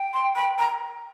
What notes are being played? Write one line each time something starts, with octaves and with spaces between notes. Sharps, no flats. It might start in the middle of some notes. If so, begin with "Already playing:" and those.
Already playing: G5
C6
B5
A#5